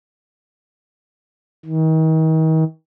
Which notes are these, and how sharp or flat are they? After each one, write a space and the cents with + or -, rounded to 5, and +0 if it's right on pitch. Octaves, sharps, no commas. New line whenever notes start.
D#3 +40